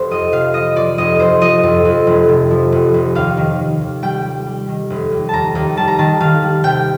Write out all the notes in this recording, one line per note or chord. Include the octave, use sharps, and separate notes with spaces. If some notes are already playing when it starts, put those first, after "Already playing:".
Already playing: F1 C5
F2 D#5
C3 F5
F3 D#5
F3 D5
F1 D#5
F2 C5
F3 D#5
F2
F2
F1
C3
F3
F1
F1
D#2 F5
D#3
D#3
D#2
G3 G5
G3
G3
D#3
F1
D#2
D#2 A5 A#5
D#2
G3 A5
A#5
D#3 A5
D#3 F5
G3
C3 G5